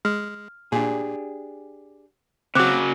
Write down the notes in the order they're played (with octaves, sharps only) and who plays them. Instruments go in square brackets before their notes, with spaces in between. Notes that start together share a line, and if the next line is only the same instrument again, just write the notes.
[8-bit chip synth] G#3 [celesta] F6
[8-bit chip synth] A#2 [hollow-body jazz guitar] D4 G4 G#4
[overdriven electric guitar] C#3 F#3 [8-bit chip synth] C4 F#4 [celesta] D6 F#6